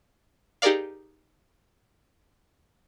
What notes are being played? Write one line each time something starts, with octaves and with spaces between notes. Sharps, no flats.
D#4 G4 G#4 A#4 D5 F5